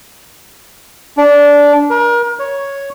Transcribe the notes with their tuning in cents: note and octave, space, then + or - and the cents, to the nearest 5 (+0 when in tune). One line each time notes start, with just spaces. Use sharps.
D4 -15
A#4 +35
C#5 +0